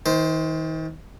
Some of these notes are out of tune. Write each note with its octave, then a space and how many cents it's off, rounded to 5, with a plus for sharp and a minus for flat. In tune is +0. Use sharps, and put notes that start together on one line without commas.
D#3 +40 C5 -5